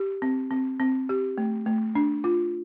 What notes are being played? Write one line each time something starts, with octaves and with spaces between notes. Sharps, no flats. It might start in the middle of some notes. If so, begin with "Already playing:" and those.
Already playing: G4
C4
C4
C4
G4
A3
A3
D4
F4